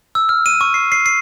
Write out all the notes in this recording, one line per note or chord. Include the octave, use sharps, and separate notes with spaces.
E6
F6
D#7
C#6
C7
C7
C7